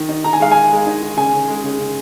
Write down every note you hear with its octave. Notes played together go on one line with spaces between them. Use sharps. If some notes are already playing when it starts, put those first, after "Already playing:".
Already playing: D#3
D#4
D#3 A#5
G#5
G#3 F5
D#3 G#5
G#3
D#4
D#3
C#3 G#5
C#3
G#3
C#3
C#3